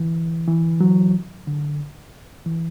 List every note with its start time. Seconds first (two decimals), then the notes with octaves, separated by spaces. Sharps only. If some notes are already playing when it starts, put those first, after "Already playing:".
Already playing: E3
0.48 E3
0.81 F#3
1.47 D3
2.46 E3